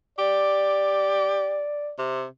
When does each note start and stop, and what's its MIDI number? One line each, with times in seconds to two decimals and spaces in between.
0.19 1.65 67
0.19 1.93 74
1.99 2.25 48